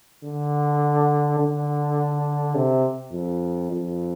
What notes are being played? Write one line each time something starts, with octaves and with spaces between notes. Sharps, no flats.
D3
D3
C3
F2
F2